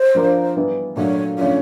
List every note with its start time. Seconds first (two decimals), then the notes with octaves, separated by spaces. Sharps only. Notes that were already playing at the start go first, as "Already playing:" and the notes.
Already playing: C5
0.15 F3 A#3 D4 F4 A#4
0.56 E3 G3 B3
0.96 A#2 F#3 A3 D4 F#4 C#5
1.37 C#3 F3 A3 D4 F4 C#5